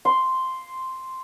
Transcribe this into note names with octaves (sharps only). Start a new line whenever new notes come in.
C6